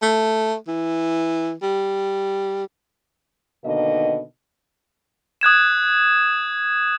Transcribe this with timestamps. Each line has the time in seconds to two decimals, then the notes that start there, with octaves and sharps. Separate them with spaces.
0.02 A3
0.68 E3
1.62 G3
3.64 B2 D3 D#3 A#3 D#5
5.41 D#6 F#6 G#6 E7